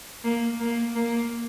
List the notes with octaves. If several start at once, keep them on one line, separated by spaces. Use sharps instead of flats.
A#3
A#3
A#3